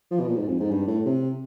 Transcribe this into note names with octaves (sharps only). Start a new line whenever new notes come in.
F3
B2
A#2
G#2
F2
G#2
G2
A2
C3